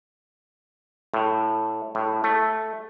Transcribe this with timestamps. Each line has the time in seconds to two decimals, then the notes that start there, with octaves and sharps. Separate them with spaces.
1.14 A2
1.95 A2
2.24 A3